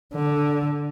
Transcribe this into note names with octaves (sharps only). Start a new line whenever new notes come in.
D3